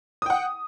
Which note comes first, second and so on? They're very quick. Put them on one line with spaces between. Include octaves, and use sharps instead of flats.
D#6 G5 F#5